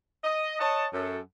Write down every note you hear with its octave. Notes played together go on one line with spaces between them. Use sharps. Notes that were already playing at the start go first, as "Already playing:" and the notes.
D#5
C#5 D#5 F#5 A5
F#2 A4